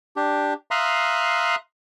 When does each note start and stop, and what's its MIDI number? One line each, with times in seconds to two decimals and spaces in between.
0.16 0.54 62
0.16 0.54 67
0.71 1.56 76
0.71 1.56 77
0.71 1.56 82
0.71 1.56 84
0.71 1.56 87
0.71 1.56 90